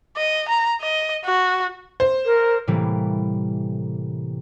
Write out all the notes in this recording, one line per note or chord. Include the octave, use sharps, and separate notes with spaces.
D#5
A#5
D#5
F#4
C5
A#4
A2 C3 E3 G3 A#3